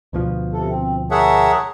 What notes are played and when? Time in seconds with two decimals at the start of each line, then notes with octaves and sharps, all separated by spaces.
0.13 D2 B2 F3
0.53 C3 A4
0.70 C4
1.11 G#4 A#4 C#5 E5 F#5 A5